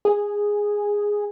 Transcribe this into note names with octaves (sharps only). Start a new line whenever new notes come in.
G#4